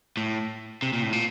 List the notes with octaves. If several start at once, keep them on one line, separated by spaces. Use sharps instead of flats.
A2
C3
A#2
A2
A#2